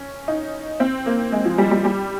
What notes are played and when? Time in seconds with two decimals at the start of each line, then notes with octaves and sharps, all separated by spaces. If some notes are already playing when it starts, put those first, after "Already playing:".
Already playing: C#4
0.28 D#4
0.80 C4
1.06 A#3
1.32 G#3
1.45 F3
1.58 G3
1.71 G3
1.85 G3